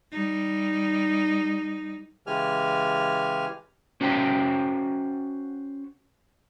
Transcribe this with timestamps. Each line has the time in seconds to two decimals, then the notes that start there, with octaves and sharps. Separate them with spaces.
0.11 G3 D#4
2.27 C#3 E3 G#3 G4 G#5 F6
4.01 C#4 F#4 C5 G5